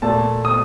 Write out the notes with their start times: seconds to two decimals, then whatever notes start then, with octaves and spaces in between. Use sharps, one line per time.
0.02 A#2 A3 A5
0.45 D#6